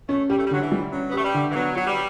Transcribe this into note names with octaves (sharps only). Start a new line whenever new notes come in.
A3 C#4
G3 G4
A3
G3
D3 F#3
E3
G3
F#3 C#4
B3
A3 G4
G3
D3
E3
F#3 B3
F#3 F#4
G3